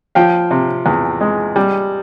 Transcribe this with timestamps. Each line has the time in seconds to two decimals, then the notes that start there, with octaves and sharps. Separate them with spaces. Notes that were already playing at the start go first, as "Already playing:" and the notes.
0.15 F3 F5 G5
0.51 C3
0.86 E2
1.21 G#3
1.56 G3